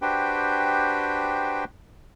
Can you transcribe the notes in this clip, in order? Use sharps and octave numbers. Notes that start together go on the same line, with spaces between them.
D4 F#4 G4 B4 C5 G5